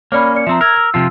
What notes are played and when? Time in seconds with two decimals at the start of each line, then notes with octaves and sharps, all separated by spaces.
0.12 A#3 C#4 C#5 D5 B5
0.35 D5 C#7
0.47 F3 C4 E5 A#5
0.61 A#4 E6 G#6
0.76 E6
0.94 C3 F3 F4